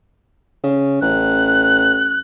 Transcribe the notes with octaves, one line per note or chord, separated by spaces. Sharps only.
C#3
A1 F#6